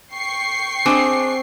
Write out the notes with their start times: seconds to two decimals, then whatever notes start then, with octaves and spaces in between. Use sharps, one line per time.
0.14 G5 C#6 C7
0.86 C4 D4 G#4 C5 D#5 D#6